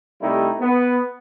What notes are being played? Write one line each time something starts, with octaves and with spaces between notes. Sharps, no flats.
C3 G3 A3 D#4 E4
B3